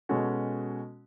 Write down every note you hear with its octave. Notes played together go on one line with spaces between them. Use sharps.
B2 G#3 C#4 F#4 A4